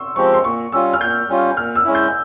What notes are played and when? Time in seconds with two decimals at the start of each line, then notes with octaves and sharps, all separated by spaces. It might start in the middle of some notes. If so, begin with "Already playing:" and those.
Already playing: C6 C#6 E6
0.16 F3 G#3 C4 G4 C#6
0.34 C6
0.44 A#2 C#6
0.72 G3 C#4 F4 E6
0.93 F6
1.00 A#2 G6
1.29 G3 C#4 F4
1.57 A#2 F6
1.75 E6
1.84 G#3 C#4 E4
1.95 G6